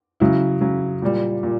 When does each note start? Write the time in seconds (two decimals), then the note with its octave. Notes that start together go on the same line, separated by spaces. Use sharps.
0.20 C#3 F#3 E4
0.61 C#3 F#3
1.02 A#2 G3
1.43 A#2